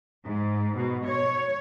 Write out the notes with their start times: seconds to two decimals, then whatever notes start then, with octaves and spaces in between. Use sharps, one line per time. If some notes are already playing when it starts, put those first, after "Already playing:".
0.25 G#2
0.76 B2
1.06 C#5